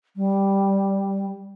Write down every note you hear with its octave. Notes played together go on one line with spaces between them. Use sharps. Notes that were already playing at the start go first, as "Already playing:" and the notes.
G3